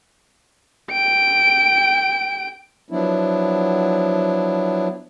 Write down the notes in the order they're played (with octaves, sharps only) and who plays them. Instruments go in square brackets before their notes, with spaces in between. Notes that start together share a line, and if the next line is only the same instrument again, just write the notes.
[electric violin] G5 D7
[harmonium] F3 F#3 B3 D4 E4